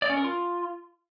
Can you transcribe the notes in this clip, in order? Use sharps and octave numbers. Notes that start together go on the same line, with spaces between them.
D5
C#4
A#4
F4